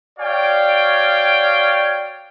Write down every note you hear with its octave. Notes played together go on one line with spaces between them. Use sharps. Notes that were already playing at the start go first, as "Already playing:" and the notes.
F#4 C#5 D5 F5 G5